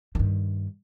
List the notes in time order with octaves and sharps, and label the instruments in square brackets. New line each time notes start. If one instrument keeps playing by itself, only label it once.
[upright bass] G2 D#3